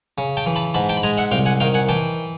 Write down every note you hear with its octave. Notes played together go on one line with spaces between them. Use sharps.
C#3
G5 A5
E3
A5 B5
G#2 A5 B5
G5 A5
B5
G#3 G#5 A#5
E5 F#5
C2 F5 G5
F#5 G#5
D#3 F5 G5
F#5 G#5
E3 G5 A5